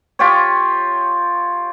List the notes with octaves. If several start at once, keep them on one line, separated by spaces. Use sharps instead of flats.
F4 G4 C#5